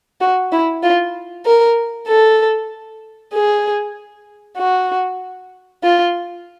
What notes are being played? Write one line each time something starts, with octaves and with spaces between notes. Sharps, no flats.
F#4
E4
F4
A#4
A4
G#4
F#4
F4